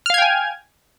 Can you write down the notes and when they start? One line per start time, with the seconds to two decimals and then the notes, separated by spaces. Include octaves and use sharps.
0.06 F6
0.10 F5
0.14 G#6
0.18 G5
0.22 G#5